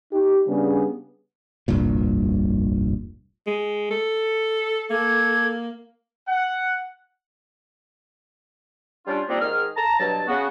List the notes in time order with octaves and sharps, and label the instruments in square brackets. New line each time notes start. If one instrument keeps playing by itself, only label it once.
[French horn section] D#4 G4
C#3 G3 B3 D4 G#4
[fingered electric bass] F1 C2 G2 A#2
[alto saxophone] G#3
A4
[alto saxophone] A#3 [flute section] A4 D6 G#6
[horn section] F#5
[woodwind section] G3 C#4 D4 F4
F3 G3 A#3 C4 D4 D#4
G#2 D#3 G#4 D#5 F6
A5 A#5
G2 B2 F#3 A5
C#3 B3 F#4